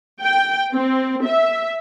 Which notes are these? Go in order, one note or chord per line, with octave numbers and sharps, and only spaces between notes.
G5
C4
E5